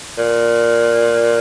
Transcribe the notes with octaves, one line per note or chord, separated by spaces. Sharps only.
A#2